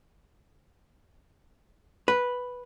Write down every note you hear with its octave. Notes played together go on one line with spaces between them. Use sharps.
B4